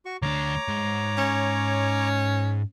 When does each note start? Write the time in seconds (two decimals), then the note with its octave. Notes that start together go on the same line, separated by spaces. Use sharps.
0.05 F#4 C#6
0.22 D2 D4 C#5 A#5 D6
0.69 G#2
1.18 C#4